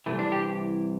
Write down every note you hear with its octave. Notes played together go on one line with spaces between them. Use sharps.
C2 C3 E3 A3
D4
G4